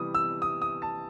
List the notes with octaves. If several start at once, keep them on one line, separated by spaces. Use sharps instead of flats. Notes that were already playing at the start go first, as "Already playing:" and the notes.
Already playing: C3 E3 G3 D#6
E6
D#6
D#6
A5